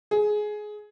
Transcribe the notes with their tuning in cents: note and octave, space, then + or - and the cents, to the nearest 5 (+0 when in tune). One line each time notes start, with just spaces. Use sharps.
G#4 +15